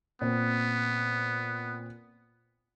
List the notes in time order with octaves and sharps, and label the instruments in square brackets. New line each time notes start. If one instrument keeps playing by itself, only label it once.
[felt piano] A#2 C4 [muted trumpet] B3